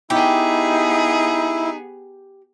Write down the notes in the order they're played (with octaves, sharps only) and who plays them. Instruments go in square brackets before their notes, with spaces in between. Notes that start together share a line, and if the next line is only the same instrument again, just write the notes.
[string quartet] B3 G#4 [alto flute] D#4 [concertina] E4 [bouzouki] G4